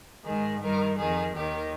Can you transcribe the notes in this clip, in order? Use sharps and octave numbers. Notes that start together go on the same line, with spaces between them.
G#2 D#3 G#4
G2 D#3 A#4
F2 D#3 G#4
D#2 D#3 G4